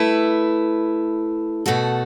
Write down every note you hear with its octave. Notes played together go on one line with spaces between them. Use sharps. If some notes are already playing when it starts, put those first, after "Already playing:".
Already playing: A3 E4 B4
B2 A3 F#4 A4